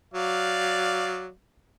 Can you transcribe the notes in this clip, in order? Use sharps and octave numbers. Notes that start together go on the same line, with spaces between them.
F#3 D5 F5